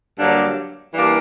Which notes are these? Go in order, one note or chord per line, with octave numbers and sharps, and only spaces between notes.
G2 D3 F#3 A#3 D4
E3 G3 A#3 D4 G4